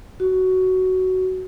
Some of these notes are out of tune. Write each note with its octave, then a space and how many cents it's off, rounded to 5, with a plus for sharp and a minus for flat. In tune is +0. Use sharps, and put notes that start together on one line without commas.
F#4 +10